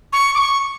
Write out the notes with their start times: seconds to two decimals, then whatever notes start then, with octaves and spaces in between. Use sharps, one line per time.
0.13 C#6
0.35 D6
0.39 C#6